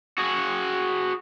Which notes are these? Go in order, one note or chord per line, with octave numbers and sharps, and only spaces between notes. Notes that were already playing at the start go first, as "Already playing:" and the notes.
F#4 G#4